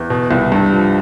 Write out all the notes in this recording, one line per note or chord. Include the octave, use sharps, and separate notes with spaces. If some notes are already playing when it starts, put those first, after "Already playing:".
Already playing: E2
B2
C2
G2
F3